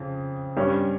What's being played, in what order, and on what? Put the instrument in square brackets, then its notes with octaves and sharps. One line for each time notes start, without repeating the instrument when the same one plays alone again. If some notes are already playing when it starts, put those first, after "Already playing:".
Already playing: [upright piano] F2 C#3
G2 G3 C#4